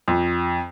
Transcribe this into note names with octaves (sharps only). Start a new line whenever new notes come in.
F2